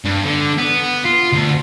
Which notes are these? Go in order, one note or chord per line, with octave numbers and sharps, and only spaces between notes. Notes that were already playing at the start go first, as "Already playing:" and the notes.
G2
D3
B3
F4
D2